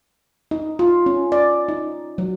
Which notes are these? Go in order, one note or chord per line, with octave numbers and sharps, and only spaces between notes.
D#4
F4
C#4
D5
D#4
F#3